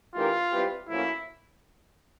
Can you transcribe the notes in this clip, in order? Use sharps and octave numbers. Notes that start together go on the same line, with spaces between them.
E3 A3 D4 F4 G4 A#4
G3 C4 E4 G4 B4
A2 F3 A#3 C#4 E4 F#4